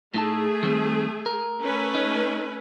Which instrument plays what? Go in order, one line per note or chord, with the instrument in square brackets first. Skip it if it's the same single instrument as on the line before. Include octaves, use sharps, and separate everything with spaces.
[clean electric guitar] A2 D#4 A5 [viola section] A3 G#4
[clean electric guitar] D#3 G3 C4
A#4
[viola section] A3 C#4 B4
[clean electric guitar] D#4